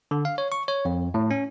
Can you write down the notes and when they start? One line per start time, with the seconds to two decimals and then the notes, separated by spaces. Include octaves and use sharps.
0.11 D3
0.25 F5
0.38 C#5
0.52 C#6
0.68 C#5
0.85 F2
1.14 A2
1.31 C#4